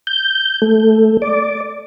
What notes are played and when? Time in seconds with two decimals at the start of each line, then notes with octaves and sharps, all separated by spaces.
0.07 G6
0.62 A3
1.22 D5